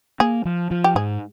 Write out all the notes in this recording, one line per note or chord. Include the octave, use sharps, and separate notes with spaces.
A#3 G#4
F3
F3
G4
G#2 G#4